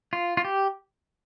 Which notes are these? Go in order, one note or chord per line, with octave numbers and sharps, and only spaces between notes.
F4
F4
G4